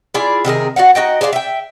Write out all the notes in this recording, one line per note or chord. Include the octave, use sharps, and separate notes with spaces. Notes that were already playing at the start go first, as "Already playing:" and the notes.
E4 F4 G#4 D5
C3 D#3 G#4 A#4
F#4 D5 F5 F#5
D#4 F#4 D#5 G5
G#4 C5 D5 F5
E5 G5